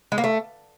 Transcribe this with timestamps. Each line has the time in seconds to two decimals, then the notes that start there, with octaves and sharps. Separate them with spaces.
0.12 G#3
0.18 A#3
0.24 A3